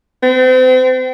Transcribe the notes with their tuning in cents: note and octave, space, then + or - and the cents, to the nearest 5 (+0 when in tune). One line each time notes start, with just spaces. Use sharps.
C4 -35